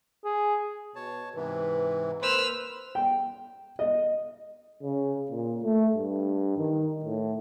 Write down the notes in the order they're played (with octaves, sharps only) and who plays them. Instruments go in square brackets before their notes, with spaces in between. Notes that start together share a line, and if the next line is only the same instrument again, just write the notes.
[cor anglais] G#4
[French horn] B2 [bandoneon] C#5 A5
[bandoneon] G#2 C3 E3 [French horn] B4
[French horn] A#3 [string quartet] B4 E6 F6 [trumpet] C5 [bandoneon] B5
[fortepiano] G5
D#5
[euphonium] C#3
A#2
A3
G2
D#3
A2